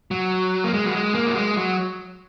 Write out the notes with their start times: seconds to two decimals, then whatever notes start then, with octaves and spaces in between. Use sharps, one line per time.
0.11 F#3
0.64 A#3
0.73 G#3
0.85 F#3
0.95 G#3
1.15 A#3
1.27 F#3
1.36 G#3
1.57 F#3